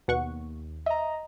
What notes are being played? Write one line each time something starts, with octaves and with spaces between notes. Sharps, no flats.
D#2 B2 F#5 C#6
D#5 E5 A#5